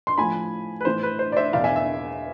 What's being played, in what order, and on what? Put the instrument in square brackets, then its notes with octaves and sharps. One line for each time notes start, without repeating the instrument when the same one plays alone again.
[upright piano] C6
A2 F3 G#5 B5
B4
A2 E3 C5
B4
C5
D5
C5 E5
E2 B2 D5 F5
E5 G#5
E5